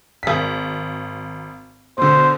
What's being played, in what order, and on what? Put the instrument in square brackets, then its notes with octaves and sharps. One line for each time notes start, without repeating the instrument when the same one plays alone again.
[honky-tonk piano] G#1 B6
[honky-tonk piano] B2 D3 [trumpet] C5